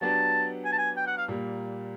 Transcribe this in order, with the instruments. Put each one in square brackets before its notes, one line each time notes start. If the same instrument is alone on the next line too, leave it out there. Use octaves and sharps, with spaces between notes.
[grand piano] F#3 B3 D4 G4 [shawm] A5
[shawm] G#5
A5
G#5
G5
F#5
F5
[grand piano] A#2 G3 A#3